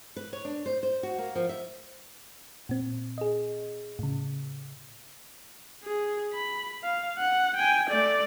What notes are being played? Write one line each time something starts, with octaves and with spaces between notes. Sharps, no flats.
B4
C#5
D4
C5
C5
F#4
A#3
F3
E5
A#2 C4
G#4 D#5
A2 C#3
G#4
B5
F5
F#5
G5 G#5
A3 D5